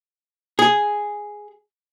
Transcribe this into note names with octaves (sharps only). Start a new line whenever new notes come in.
G#4